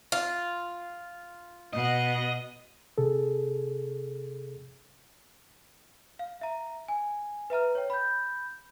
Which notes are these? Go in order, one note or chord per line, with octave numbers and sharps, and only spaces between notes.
F4
B2 D#5 F#5
C3 G#4 A4
F5
E5 A#5
G#5
B4 E5 A#5 F6
C#5 G5
B5 G6